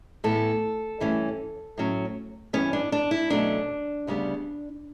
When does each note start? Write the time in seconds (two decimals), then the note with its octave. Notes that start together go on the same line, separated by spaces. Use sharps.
0.24 A2 E3 B3 A4
1.00 G2 E3 A3 C#4
1.78 A2 F#3 C#4
2.53 G2 E3 B3 C#4
2.73 D4
2.92 D4
3.11 E4
3.30 B2 F#3 A3 C#4 D4
4.07 D2 C#3 G3 B3